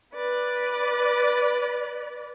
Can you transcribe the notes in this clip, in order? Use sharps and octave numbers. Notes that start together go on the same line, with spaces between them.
B4 D5